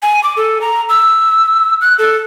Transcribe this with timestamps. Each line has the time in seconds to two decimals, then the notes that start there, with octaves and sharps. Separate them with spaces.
0.02 G#5
0.24 D6
0.37 A4
0.61 A#5
0.89 E6
1.81 F#6
1.99 A4